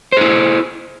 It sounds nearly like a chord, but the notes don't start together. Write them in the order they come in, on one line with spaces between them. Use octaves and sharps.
C5 G#4 E4